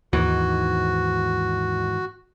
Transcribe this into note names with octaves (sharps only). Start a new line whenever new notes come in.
D#2 G#2 D#3 E3 F#4